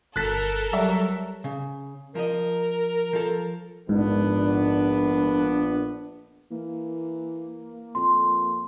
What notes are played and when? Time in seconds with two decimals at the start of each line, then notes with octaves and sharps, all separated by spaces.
0.16 G1 A4 A#4 F#6 A6 B6
0.73 F#3 G3 E5
1.44 C#3
2.15 F3 A#4 D#5
3.13 F3 A4
3.89 A#1 G#2 B3 D4
6.50 E3 A#3
7.95 F2 C6